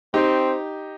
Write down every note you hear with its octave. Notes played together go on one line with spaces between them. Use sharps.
C4 D#4 G4